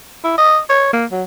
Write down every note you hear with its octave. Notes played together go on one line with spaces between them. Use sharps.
E4
D#5
C#5
A#3
F#3